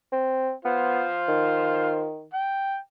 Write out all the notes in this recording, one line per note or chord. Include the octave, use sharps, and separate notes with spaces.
C4
B3 F4 C5
D#3
G5